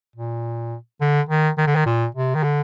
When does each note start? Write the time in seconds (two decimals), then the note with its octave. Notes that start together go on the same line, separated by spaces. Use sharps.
0.16 A#2
1.01 D3
1.29 D#3
1.58 D#3
1.67 D3
1.76 D#3
1.86 A#2
2.15 C3
2.35 D#3
2.43 D3